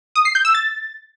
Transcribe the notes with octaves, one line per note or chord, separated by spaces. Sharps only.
D#6
C7
G6
E6
A6